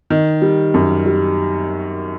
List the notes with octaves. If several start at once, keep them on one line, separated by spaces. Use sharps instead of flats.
D#3
G3
F#2
G3